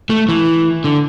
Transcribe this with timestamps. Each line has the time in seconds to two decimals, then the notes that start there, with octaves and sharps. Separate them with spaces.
0.10 A3
0.29 E3
0.84 D3